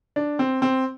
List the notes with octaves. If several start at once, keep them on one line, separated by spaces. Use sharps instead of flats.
D4
C4
C4